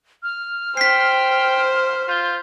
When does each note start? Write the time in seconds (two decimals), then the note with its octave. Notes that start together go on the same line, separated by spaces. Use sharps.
0.23 F6
0.77 C5 G5 B6 C7
2.08 F4 G6